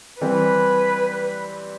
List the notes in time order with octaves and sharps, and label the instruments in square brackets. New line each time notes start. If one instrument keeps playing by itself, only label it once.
[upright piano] E3 G3 C4 G4 [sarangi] B4